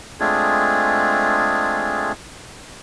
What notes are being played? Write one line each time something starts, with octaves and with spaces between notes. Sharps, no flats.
G#3 A3 C4 D4 F4 G#4